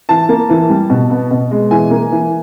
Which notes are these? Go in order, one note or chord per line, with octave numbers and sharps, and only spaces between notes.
E3 A5
A#3
E3
G3
B2
B3
B2
G#3
E3 G#5
A#3
E3